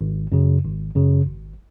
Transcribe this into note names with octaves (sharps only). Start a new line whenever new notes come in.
G#1
F#2 C#3
G#1
F#2 C#3
G#1